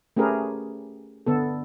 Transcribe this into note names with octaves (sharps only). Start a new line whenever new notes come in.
A3 C#4 G4 G#4 A#4 B4
D3 B3 A4